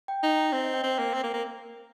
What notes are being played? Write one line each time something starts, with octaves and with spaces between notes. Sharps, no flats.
G5
D#4
C4
D#5
G5
C4
A#3
C4
A#3
A#3